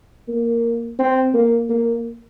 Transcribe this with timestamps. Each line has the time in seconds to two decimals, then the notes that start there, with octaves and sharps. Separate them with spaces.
0.28 A#3
0.99 C4
1.34 A#3
1.69 A#3